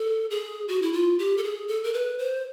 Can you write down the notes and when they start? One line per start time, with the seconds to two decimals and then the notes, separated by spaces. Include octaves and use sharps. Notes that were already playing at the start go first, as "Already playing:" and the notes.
Already playing: A4
0.30 G#4
0.68 F#4
0.82 E4
0.93 F4
1.19 G4
1.37 A4
1.44 G#4
1.68 A4
1.84 A#4
1.94 B4
2.19 C5